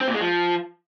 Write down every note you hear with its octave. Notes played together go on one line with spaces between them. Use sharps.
C4
A#2
G#3
F3